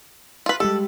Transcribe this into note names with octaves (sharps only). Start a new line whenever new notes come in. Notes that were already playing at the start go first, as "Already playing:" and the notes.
F4 B4
G3 G#3 G4 A4